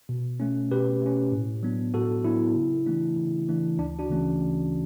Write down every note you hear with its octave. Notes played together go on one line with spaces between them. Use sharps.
B2
A3 C#4
B2 G4 B4
A3 C#4
A2
F#3 B3 D4
A2 F#4 A4
F#3 B3 D4 E4
C#3
E3 A3 D4
C#3
E3 A3 D4
D2 D4
D4 F#4
C#3 E3 A3 C#4